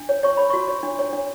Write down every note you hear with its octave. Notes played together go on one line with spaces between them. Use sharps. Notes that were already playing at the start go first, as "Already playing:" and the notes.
Already playing: D4
C#5
C#5 C#6
C#5 B5
F#4 C#6
C#5
D4
C#5
D4